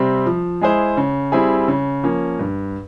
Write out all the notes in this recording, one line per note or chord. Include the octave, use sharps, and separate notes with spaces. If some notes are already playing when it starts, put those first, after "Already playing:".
Already playing: C3 G3 C4
F3
G#3 E4 G#4 C5
C#3
G3 C4 E4 G#4
C#3
F3 A#3 C#4
G2